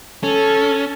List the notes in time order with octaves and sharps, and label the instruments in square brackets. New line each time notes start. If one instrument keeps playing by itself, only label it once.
[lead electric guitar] C#4 [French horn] A4